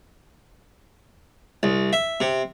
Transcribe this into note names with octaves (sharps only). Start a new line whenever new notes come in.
C2
E5
C3